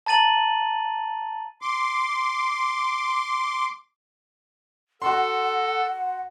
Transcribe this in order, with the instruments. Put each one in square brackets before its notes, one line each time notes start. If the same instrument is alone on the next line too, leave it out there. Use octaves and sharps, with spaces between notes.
[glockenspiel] A5 A#5 A6 D#7 F#7
[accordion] C6 D6
[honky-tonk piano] F#4 C6 [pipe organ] A4 [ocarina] F#5